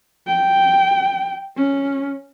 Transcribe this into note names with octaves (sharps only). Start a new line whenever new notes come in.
G5
C#4